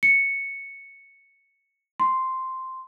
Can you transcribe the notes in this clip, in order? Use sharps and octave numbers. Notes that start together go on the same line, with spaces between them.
C#7
C6